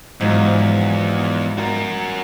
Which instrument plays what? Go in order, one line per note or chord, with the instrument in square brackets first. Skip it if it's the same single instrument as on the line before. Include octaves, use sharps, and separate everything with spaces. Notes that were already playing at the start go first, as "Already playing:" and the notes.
[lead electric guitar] E2 [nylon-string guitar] G#2 F3 F#3
[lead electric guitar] F#4 A#4